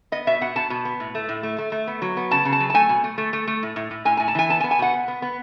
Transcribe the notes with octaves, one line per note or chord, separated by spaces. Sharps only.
B3 D#5
B2 E5
B2 F#5
B2 A5
B2
B3
A2
A3
A2
A3
A3
A3
B3
F#3
B3
C#3 A5
C#3
A5
F#3
A5
A3 G#5
B2
A3
A3
A3
A3
A2
A2
A2
A2 G#5
A2 G#5
A5
E3 G#5
B3 A5
G#5
B3
G#5
B2 F#5
B3
B3
B3